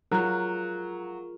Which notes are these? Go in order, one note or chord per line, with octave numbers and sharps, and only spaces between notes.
F#3 F4 G#4 A#4 A#5 F#6